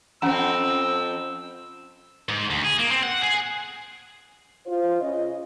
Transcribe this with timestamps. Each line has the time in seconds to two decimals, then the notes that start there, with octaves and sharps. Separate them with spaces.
0.22 F2 C4 C#4 F#5 A#5 E6
2.29 G#2
2.50 D2
2.64 G#4
2.79 A#3
2.91 C4
3.03 F#5
3.22 G#4
4.66 F4 C5
5.01 C#3 D#5